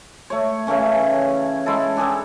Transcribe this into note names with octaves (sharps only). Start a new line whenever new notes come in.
A3 C#5
C#3 E3 A3 C#4
G#3 E4 A4
D4 G#4 A4 G5